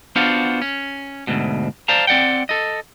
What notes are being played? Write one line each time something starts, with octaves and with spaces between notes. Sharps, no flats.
B3 D4 F4 F#4 C5 F5
C#4
D2 G#2 B2
C5 D5 F5 A5 A#5
C4 D5 F#5 G5
A4 D#5